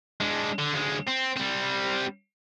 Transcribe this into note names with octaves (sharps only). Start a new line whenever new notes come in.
G#3 D4
D3
D2 G#3
C4
G3 C4